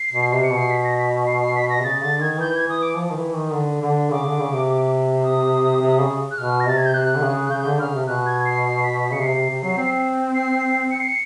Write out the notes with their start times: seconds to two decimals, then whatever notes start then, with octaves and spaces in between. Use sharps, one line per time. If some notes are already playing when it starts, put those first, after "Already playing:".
Already playing: C7
0.13 B2
0.32 C3
0.43 C#7
0.51 B2
0.57 C7
0.70 B6
0.84 A#6
0.99 B6
1.27 C7
1.41 C7
1.56 B6
1.70 A#6
1.78 C3
1.84 C#3 A6
2.02 D3 A6
2.21 D#3 G#6
2.40 E3 G6
2.55 G#6
2.68 E3 D#6
2.82 D6
2.96 F3
3.11 D#3
3.16 E3
3.35 D#3
3.54 D3
3.82 D3
4.11 C#3 D6
4.25 D3
4.39 C#3
4.52 C3
5.24 D#6
5.81 C3
6.00 C#3
6.31 F#6
6.37 B2 F6
6.60 A#6
6.66 C3 A6
6.78 G#6
6.86 G6
6.94 C3 F#6
7.16 D3
7.22 C#3
7.46 F#6
7.50 C#3 G6
7.65 D3
7.80 C#3 F6
7.94 C3
8.07 B2 F#6
8.26 G#6
8.45 C7
8.65 C7
8.84 B6
9.02 B6
9.12 C#3 C#7
9.21 C3 C7
9.35 C3
9.49 C3
9.63 F#3
9.77 C4
10.35 C7
10.91 C#7
11.00 C7
11.08 C#7